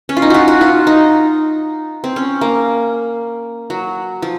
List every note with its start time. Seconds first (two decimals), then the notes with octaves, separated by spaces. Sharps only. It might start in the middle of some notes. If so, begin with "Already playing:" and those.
0.09 C#4
0.17 F4
0.22 D#4
0.30 F4 F#4
0.48 F#4
0.61 F4
0.87 D#4
2.04 C4
2.16 C#4
2.41 A#3
3.70 F#3
4.22 F3